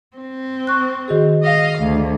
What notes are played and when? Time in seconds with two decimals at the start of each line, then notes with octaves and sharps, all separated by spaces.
0.17 C4
0.67 C#6 F#6
1.08 D#3 F#4 G#4
1.43 D#5 F5
1.80 D2